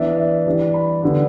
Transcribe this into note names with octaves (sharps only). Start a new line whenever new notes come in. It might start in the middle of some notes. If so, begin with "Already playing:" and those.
Already playing: E3 B3 D4 E5
E5
E3 G3 D4
B5
D3 G3 B3 D4